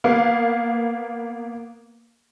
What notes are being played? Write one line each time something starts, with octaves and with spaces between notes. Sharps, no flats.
A#3 B3 F5